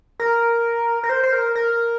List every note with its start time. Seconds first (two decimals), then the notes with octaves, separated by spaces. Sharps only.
0.20 A#4
1.03 A#4
1.09 C5
1.23 C5
1.32 A#4
1.55 A#4